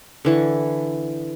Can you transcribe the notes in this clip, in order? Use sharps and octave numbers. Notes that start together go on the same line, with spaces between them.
D3 E3 C#6